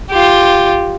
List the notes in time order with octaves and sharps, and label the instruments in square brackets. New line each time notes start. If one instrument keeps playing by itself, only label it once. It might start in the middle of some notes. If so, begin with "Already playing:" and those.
[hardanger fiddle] F4 G4